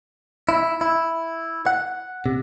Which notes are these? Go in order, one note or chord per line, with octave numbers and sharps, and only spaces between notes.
E4
E4
F#5
C3